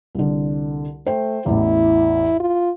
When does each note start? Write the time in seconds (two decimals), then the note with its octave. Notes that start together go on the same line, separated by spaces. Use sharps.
0.15 C2 D3
1.06 A3 C5 G5
1.46 A1 E2 E4
2.40 F4